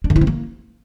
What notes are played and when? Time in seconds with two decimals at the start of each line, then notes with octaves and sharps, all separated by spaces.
0.04 D4
0.10 D3
0.16 E4
0.21 C4
0.27 A#3